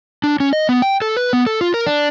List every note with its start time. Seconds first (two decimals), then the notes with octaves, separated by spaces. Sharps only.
0.24 D4
0.40 C#4
0.53 D#5
0.69 B3
0.82 G5
1.02 A4
1.17 B4
1.33 B3
1.47 A4
1.61 F4
1.74 A#4
1.86 D4